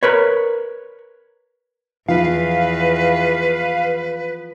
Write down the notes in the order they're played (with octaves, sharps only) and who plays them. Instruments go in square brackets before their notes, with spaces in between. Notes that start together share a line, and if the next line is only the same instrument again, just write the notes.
[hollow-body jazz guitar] A#4 B4 C#5
[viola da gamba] E2 [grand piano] F3 [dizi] B4 [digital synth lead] F5